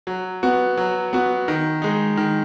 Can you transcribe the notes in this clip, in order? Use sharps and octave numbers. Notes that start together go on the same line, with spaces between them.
F#3
B3 F#4
F#3
B3 F#4
D#3
G#3 D#4
D#3